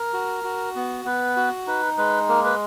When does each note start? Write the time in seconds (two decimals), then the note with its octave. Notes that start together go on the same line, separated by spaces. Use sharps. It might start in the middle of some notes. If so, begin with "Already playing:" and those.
Already playing: A#4
0.13 F#4
0.44 F#4
0.75 B3
1.05 B3 B4
1.36 F#4
1.67 D#4 B4
1.98 G#3 B4
2.29 A#3 A#4
2.44 B4